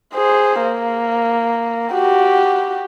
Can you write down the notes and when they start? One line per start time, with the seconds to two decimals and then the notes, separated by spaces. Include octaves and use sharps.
0.15 G#4 C5
0.62 A#3
1.94 F#4 G4